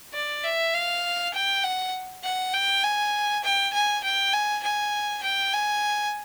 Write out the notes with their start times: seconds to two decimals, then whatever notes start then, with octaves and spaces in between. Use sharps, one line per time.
0.14 D5
0.44 E5
0.74 F5
1.34 G5
1.64 F#5
2.24 F#5
2.54 G5
2.83 G#5
3.44 G5
3.73 G#5
4.04 G5
4.33 G#5
4.63 G#5
5.23 G5
5.53 G#5